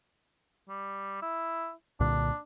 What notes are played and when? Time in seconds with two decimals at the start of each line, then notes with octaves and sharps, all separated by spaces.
0.69 G3
1.22 E4
2.00 C2 A#2 D3 D4